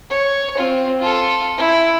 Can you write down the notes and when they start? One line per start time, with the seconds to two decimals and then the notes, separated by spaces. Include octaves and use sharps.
0.10 C#5
0.57 C4 F4
0.99 F4 A4
1.58 E4